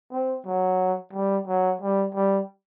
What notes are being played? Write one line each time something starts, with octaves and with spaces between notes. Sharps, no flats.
C4
F#3
G3
F#3
G3
G3